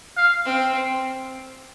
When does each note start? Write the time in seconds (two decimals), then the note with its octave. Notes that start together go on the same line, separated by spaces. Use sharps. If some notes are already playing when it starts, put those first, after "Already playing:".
0.17 F5
0.45 C4